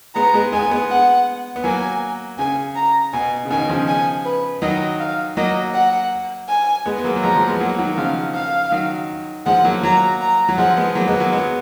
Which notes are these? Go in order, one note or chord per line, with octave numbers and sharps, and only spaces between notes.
G#3 B3 A#5
G#3 B3
G#3 B3 G#5
G#3 B3
F#5
B3
F#3 A#3 G#5
C#3 G#5
A#5
B2 G#5
C#3
B2 D#3 G#5
C#3 F3
G#5
B4
D#3 F#3 D#5
F5
F#3 A#3 D#5
F#5
G#5
G#3 B3
B3
F#3 A#3
F#3
F3 G#3 A#5
F3 G#3
G#3 B3
F#3 A#3 F#5
D#3 F#3
C#3 F3 F5
F5
D#3 F#3
F3 G#3 F#5
F#3 A#3
F#3 A#3 A#5
A#5
F#3
F3 G#3 F#5
G#3 B3
F#3 A#3
G#3 B3
F#3 A#3
G#3 B3